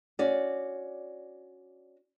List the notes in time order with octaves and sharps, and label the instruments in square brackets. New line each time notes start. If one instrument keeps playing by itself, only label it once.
[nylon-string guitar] C#4 F#4 D5